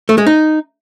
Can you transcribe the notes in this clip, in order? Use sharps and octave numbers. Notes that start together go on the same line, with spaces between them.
A3
G#3
D#4